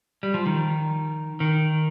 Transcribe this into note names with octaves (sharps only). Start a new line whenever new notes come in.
G3
F3
D#3
D#3